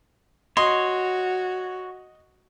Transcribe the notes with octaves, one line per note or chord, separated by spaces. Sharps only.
F#4 C#5 D#5 C6